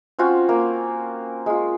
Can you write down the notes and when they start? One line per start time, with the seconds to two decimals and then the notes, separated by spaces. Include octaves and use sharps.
0.19 C4 C#4 F4 F#4
0.49 A#3
1.46 G#3 F4